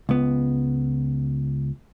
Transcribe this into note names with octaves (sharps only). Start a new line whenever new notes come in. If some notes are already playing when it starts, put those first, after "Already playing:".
C#2 B3